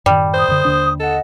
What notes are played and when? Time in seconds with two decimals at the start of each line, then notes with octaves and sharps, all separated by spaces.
0.06 F#2 A2 D#3 G3
0.34 C5 D#6
0.48 F#2 D3
0.65 D#2 D3 D4
1.00 A4 D#5 F#5